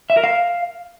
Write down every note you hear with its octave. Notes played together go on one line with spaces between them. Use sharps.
E5
A#4
F5